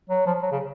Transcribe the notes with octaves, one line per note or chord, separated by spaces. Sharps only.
F#3
F3
F#3
C#3